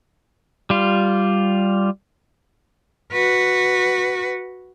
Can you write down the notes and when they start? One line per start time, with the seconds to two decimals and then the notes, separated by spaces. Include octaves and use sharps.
0.70 G3 F4
3.12 F#4 B4